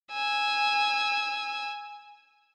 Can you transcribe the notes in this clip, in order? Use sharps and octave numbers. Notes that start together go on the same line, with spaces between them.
G#5 E6